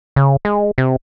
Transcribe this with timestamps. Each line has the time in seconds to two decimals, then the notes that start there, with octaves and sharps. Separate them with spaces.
0.16 C#3
0.45 G#3
0.78 C3